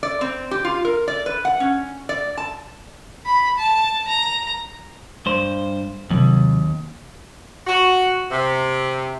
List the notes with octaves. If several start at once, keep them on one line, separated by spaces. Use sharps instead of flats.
D5
C4
G4
F4
A#4
D5
B4
F#5
C#4
D5
A5
B5
A5
A#5
G2 C5
D#2 C3 F#3
F#4
C3